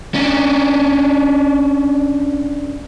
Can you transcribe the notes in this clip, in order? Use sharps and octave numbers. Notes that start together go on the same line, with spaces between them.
C#4 D4